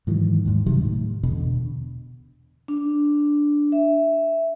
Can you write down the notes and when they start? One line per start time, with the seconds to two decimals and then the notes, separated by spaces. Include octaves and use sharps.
0.07 G#2 D#3 E3 F#3
0.45 D#2 G#2
0.66 C3 D#3 F#3 G3
0.83 A2
1.23 E2 B2 D3
2.68 D4
3.72 E5